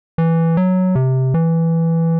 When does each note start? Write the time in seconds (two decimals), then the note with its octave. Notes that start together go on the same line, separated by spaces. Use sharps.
0.18 E3
0.57 F#3
0.95 C3
1.34 E3